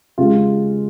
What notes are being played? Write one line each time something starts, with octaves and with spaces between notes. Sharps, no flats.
C#3 G#3 C#4 F4